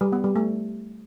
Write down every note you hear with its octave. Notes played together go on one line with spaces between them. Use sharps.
G3
B3
G3
A3